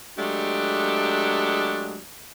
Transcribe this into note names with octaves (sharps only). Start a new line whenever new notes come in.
F#3 G#3 A3 D4 G4